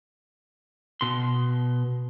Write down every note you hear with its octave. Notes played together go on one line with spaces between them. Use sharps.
B2 C6